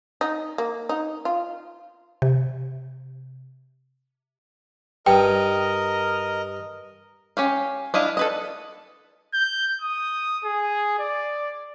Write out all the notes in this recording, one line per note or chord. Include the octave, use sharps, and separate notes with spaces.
D#4
A#3
D#4
F4
C3
G2 A#4 D#5 G5
C#4 G4 F5
D4 E4 D#5 F5
A4 B4 D#5
G6
D#6
G#4
D5